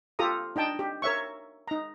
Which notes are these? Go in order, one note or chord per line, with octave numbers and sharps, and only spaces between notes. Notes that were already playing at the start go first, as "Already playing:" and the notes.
F4 G4 A4 A#5 D#6
D4 D#4 G5 A5
G4
A#4 C#5 E5 C#6
D#4 A#5